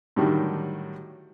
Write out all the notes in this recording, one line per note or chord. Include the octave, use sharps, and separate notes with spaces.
A2 D3 D#3 F#3 G3